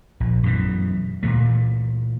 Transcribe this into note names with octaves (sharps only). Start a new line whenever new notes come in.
A#1
F#2 B2 E3
A#2 E3 A3